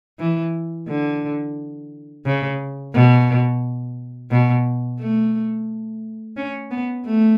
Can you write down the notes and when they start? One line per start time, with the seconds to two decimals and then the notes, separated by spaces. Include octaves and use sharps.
0.19 E3
0.88 D3
2.25 C#3
2.94 B2
4.31 B2
4.99 A3
6.37 C#4
6.71 B3
7.06 A3